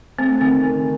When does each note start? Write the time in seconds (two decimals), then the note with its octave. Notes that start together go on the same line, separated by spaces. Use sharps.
0.19 A3 C4
0.41 D#3 C4
0.64 D#3